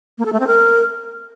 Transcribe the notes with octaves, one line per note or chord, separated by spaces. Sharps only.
A#3
A4
A3
C4
A#4